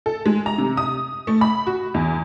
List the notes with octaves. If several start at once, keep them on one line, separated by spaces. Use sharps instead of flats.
A4
G#3
A#5
C3
D#6
A3
B5
F#4
E2